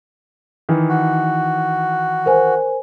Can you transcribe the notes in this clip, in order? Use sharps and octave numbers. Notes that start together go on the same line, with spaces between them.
D#3 E3
F#4
A#4 C5 G#5